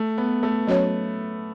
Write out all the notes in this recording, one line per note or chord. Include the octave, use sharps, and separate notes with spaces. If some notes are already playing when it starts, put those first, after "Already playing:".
Already playing: A3
B3
A3
F#3 C#4 F#4 C#5